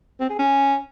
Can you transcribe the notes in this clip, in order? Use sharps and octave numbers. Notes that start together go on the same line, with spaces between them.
C4
G#4
C#4